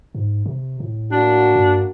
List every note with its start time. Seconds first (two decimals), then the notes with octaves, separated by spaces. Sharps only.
0.15 G#2
0.46 C3
0.80 A2
1.11 A#3 D4 F#4
1.55 G2